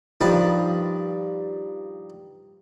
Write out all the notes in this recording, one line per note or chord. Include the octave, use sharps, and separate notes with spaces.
G2 D#3 F3 B4 A5